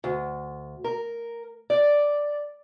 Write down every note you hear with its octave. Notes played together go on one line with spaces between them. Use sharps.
D2
A#4
D5